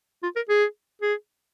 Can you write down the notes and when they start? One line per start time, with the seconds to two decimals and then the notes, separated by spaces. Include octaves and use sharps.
0.23 F4
0.36 A#4
0.49 G#4
1.02 G#4